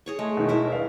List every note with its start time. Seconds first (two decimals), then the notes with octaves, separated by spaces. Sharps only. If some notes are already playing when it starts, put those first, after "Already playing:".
0.06 G#4 C#5 C#6
0.19 G#3 A3
0.37 B2 D#3
0.49 D#2 E4 A#4 E5
0.72 G2 F5